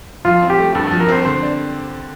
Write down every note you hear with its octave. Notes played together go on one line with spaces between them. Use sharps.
F3 F4
C4
G4
A3
G2 A4
F3 A4
A#4
C4 C5
D3 C5
D4